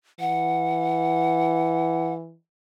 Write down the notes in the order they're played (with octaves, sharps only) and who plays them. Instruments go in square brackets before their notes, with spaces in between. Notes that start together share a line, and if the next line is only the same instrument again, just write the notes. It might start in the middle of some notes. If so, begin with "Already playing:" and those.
[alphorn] E3 [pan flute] F#5